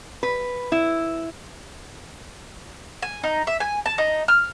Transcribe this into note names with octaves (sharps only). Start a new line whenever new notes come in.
B4
E4
G#5
D#4
E5
G#5
A5
D#4
F6